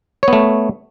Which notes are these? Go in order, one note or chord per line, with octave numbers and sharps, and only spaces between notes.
A3 B3 C#5